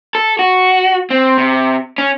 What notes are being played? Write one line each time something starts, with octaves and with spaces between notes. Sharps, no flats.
A4
F#4
C4
C3
C#4